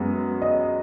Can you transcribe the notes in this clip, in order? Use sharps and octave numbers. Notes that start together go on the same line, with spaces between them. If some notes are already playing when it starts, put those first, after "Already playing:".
Already playing: F#2 G#3 B3
D#5